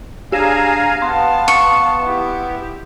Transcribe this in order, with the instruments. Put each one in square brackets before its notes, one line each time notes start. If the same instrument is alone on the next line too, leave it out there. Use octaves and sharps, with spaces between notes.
[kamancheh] D4 G#4 [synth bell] G4 E7 [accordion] F5 G#5 A#5
[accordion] B3 [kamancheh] F5 A5 [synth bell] C6
[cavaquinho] C#6
[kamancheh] E4 G4